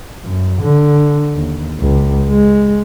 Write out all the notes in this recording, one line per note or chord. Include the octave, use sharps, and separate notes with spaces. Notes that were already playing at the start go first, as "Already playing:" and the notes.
F#2
D3
D#2
C#2
G#3